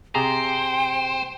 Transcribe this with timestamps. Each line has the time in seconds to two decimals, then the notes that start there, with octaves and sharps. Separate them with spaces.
0.15 C3 G#4 C5 G5 A#5